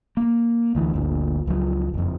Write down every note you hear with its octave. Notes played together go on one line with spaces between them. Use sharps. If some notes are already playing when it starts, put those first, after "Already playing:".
A#3
D2 E3
G1 D2 A#2
C#2 F3 F#3
F#1 F2